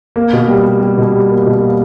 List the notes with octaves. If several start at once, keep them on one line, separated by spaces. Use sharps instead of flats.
A#3
B2
G3
G3
G3
B2
G3
A#3
B2
A#3